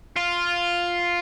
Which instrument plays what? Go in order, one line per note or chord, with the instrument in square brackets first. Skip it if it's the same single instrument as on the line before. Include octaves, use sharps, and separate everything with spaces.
[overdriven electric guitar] F4